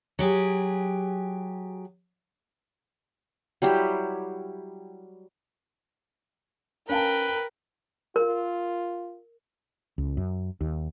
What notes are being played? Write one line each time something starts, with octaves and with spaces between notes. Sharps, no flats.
F#3 G4 G#4
F#3 G3 E4 G4
C#4 A#4 B4 F5 G5 A5
F4 A#4
C#2
F#2
D#2